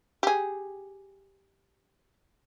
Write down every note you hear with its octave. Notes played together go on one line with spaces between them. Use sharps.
G4 G#4